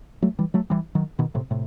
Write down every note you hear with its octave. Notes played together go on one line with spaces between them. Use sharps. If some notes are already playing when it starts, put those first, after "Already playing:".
F#3 A3
E3 G3
F#3 A3
E3 G3
D#3 F#3
B2 D#3
A2 C3
A2 C3